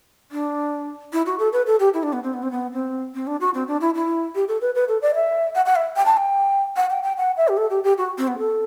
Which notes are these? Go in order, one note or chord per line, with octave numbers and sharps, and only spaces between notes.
D4
E4
F#4
A4
B4
A4
G4
E4
D4
B3
C4
B3
C4
B3
C4
C4
D4
F#4
C4
D4
E4
E4
G4
A4
B4
B4
A4
D5
E5
F#5
F#5
E5
G5
A5
G5
F#5
G5
G5
F#5
E5
G4
A4
G4
G4
F#4
C4
B3
A4